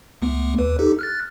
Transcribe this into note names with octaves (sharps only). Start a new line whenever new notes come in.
C#2 A3 B3
D#2 B4
D#4 G4 A4
F6 F#6 A6